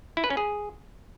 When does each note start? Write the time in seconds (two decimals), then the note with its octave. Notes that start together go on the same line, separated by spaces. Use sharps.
0.17 E4
0.24 B4
0.30 C#4
0.37 G#4